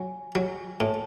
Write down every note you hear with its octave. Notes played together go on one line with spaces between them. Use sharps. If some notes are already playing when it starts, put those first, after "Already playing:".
Already playing: F#3 G#5
F#3
A2 A5